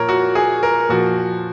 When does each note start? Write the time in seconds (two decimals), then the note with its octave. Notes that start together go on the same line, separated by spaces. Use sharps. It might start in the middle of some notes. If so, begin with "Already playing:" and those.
Already playing: A#2 F3 A#4 C#5
0.09 F#4
0.35 G#4
0.63 A#4
0.89 A#2 F3 F#4